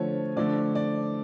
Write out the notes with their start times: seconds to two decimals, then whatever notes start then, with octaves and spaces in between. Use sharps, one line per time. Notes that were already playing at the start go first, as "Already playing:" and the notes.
Already playing: D3 F3 A3 C#5
0.36 D3 F3 A3 D5
0.75 D5